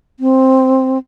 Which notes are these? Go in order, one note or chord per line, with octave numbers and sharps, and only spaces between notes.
C4